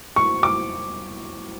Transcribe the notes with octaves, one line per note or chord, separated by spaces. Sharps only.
C#6
D6